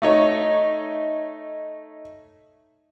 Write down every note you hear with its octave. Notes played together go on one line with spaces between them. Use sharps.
A3 D#4 C#5